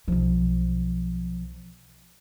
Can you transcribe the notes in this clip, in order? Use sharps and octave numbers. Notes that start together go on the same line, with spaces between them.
B1 F3